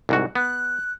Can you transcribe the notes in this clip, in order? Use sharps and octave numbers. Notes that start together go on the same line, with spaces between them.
C2 G#2 F#4
B3 F#6